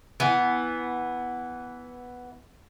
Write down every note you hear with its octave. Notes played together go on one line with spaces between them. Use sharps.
E3 B3